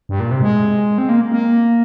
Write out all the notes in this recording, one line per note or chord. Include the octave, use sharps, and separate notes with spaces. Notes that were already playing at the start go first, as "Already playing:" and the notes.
G2
A#2
C3
G#3
C4
A#3
A#3